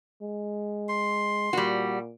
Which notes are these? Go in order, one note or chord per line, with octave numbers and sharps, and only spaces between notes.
G#3
C6
A#2 G3 F#4